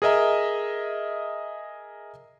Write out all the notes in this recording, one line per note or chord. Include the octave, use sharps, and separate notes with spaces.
G#4 A#4 D#5 E5 A#5